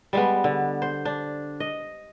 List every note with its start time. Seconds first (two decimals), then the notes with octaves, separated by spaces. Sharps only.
0.13 G3 G#3 B3
0.44 D3
0.82 C5
1.05 D4
1.60 D#5